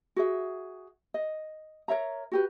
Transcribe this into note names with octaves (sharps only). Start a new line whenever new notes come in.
F#4 G#4 E5
D#5
A#4 C#5 E5 A#5
F#4 G4 B4